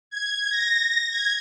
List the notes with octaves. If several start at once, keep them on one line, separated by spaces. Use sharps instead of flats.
G#6
A#6
G#6